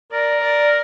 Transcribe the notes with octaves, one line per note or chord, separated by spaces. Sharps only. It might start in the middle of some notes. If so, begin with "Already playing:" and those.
A#4 D5
D5